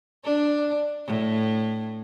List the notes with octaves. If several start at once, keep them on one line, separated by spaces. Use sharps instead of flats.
D4
A2